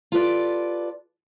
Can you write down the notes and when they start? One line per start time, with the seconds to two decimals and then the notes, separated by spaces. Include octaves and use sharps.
0.12 F4 G4 A4 B4 D5